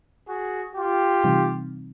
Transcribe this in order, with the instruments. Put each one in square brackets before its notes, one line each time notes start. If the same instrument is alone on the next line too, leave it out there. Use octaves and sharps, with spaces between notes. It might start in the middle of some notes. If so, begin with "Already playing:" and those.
[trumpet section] F#4 G#4
F4 G4
[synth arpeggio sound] C3 E3 G3 C4 D#4